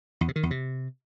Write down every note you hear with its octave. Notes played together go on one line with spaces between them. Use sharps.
E2
C3
D#3
E2
C3